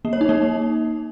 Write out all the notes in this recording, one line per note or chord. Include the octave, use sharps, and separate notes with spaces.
A#3
C#5
D#4
A#3